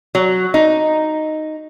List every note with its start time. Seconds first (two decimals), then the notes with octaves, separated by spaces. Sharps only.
0.15 F#3
0.54 D#4